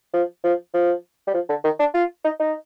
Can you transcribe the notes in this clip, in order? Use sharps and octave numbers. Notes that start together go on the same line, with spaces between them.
F3
F3
F3
G3
F3
D3
D#3
D4
F4
D#4
D#4